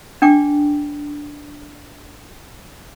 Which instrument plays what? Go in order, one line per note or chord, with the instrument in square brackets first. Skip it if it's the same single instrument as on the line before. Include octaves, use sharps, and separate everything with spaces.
[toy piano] D4 G5 D6